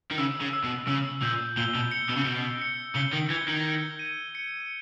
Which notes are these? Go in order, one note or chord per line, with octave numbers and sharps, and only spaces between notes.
D#3
C#3 E6
C#3
E6
B2
C#3 E6
A#2 G6
A#2 G7
B2
C#7
B2
C#3
B2 C#7
C#7
C#3 G7
D#3
E3 G#6
D#3
G7
D#7
C#7